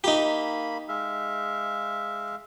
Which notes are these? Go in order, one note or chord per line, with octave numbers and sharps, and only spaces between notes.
A#3 D#4 G4 B5
G#3 E5 F5